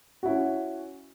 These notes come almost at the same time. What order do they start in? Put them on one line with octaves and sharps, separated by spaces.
F#4 E4 C#4